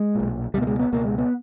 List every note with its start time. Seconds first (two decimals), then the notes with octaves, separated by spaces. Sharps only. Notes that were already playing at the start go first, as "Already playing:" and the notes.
Already playing: G#3
0.15 B1 A#2
0.54 C#2 G3
0.57 B2 A#3
0.67 G#3
0.79 B3
0.92 C#2 B2 A#3
1.05 G#3
1.18 B3